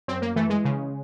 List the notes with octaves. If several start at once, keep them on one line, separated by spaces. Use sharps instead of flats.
F#2 C4
A#3
E3 A3
G#3
C#3